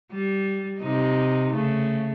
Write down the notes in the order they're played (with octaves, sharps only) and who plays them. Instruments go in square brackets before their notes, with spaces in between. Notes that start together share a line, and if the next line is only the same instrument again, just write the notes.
[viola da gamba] G3
C3 D#4
C#3 A3